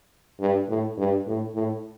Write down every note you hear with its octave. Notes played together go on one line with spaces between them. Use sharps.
G2
A2
G2
A2
A2